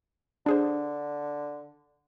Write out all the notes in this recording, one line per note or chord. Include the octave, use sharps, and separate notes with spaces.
D3 D4 G#4 C5